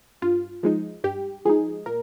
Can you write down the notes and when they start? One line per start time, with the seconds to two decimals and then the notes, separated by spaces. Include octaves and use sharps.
0.22 G2 F4
0.63 F3 G#3 D#4
1.04 G2 G4
1.45 F3 G#3 D#4 G#4
1.86 A#2 A#4